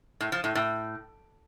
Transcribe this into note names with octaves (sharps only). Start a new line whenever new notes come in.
A2
F3
A2
A2